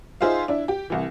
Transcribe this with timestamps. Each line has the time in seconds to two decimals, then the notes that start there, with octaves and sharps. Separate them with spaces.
0.21 D#4 F4 G#4 C5 E5 F5
0.48 D4 E4
0.68 G4
0.90 C2 E3